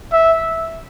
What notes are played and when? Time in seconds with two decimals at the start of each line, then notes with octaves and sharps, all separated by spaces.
0.12 E5